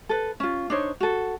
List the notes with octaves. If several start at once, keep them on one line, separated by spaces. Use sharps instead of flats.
A4 B4
C#4 F4
D4 D#4 C5 C#5
F#4 A4